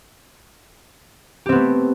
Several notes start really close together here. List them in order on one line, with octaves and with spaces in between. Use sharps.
G4 C4 B3 A3